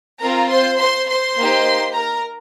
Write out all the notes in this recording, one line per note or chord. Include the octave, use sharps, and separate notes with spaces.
C4 F4 A#4 A#5
C5 C6
C5 C6
C5 C6
A#3 D#4 G4
A#4 A#5